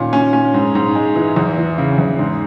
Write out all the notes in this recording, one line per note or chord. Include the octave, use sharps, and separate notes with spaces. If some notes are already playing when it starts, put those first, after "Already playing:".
Already playing: A#2 D#3 C#4
C#4
C#4
G#2
G#2
G#3
E3
E2
E3
C#3
E2
G#2